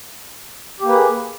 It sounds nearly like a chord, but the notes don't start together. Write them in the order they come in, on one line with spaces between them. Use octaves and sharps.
G4 A#3 B4 G#4